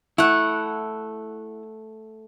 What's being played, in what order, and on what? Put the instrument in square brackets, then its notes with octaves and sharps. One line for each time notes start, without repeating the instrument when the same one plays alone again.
[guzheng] A3 F#5 [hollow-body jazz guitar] E4